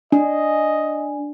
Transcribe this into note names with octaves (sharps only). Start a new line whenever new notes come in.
D4 D#5